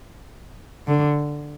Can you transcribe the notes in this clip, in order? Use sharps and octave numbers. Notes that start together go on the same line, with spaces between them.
D3